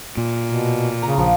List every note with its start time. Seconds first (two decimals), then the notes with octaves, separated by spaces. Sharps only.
0.17 A#2
0.45 B2
1.02 C#3 A#5
1.18 A#1 F3